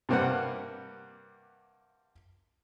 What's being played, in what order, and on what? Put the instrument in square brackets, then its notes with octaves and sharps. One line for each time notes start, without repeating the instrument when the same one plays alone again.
[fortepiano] G2 C3 A#3 C4 B4 F#5